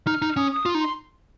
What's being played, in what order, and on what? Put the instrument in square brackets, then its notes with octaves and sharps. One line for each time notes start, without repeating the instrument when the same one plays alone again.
[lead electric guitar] D#4 [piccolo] F6
[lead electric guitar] D#4
[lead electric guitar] C#4 [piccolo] D#6
[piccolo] D#6
[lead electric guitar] F4
D#4
[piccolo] C6